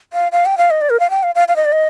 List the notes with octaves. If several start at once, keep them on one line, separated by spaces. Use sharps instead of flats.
F5
F5
G5
F5
D#5
D5
A#4
F5
G5
F5
F5
F5
D#5
D5
D#5